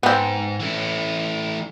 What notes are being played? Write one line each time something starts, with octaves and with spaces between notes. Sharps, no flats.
G#2 B3 C4
E3 A3